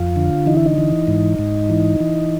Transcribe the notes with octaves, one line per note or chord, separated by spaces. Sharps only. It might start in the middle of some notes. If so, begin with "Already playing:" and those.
Already playing: F2 F4
D3
E3 D#4
E4
D#4
E3
G#2
G#2
E3
E3